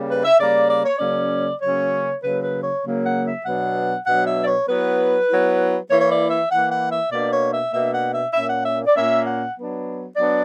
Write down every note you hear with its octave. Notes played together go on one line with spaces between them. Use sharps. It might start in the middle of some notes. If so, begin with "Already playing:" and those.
Already playing: C#3 G3 A#3
B4
E5
C#3 G3 A#3 D5
D5
C#5
C#3 F#3 A#3 C#4 D5
C#3 F#3 A#3 C#4 C#5
C#3 F#3 A#3 B4
B4
C#5
C#3 F#3 A#3
F#5
E5
B2 F#3 B3 D4 F#5
B2 F#3 B3 D4 F#5
E5
D5
C#5
F#3 B3 E4 B4
F#3 B3 E4
E3 A#3 E4 C#5
C#5
D5
E5
E3 A#3 E4 F#5
F#5
E5
B2 A#3 D4 D5
C#5
E5
B2 A#3 D4 E5
F#5
E5
A#2 A#3 C#4 E5
F#5
E5
D5
A#2 A#3 C#4 E5
F#5
F#3 B3 D4
F#3 B3 D4 D5